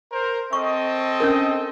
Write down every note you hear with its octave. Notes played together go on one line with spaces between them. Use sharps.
A#4 C5
C4 A4 D#5 C#6
C#4 D4 A#4